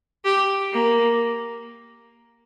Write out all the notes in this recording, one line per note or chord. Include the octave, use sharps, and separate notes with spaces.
G4
A#3